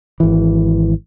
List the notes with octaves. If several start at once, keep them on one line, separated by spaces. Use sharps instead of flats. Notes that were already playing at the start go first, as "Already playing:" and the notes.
G#1 E3